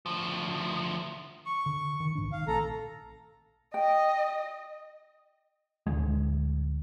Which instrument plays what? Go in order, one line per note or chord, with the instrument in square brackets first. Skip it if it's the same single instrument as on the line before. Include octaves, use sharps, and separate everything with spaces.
[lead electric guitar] D2 F3
[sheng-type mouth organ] C#6
[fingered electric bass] D3
D#3
A#1 G#2 D4
[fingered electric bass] D#3 [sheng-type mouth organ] F5
[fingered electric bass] A#1 A3 C4 [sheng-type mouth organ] A4 A#5
[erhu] D#5 [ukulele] G5
[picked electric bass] D1 D2 G#3